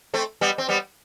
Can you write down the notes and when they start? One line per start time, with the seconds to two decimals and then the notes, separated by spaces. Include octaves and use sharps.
0.14 A3 C4
0.41 G3 B3
0.58 C4
0.69 G3 B3